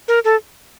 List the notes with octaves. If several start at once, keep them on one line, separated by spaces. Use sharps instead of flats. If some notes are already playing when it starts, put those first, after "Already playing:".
A#4
A4